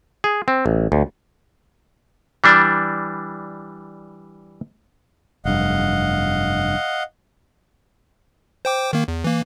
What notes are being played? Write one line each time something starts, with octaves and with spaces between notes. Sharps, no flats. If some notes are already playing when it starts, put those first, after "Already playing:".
G#4
C4
A1
D2
E3 G3 D4
F1 G2 D#5 F5 F#5
C5 G5 D6
D#3 A#3
E2
E3 A#3